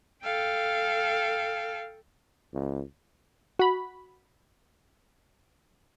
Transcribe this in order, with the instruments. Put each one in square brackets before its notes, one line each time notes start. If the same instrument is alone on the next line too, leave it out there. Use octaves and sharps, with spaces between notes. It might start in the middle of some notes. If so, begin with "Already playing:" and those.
[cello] A4 G5 [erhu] F5
[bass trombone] C#2
[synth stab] F#4 B5